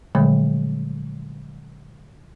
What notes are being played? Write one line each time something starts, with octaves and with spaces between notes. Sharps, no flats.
A#2 D3 F3 F#3 G#3 A3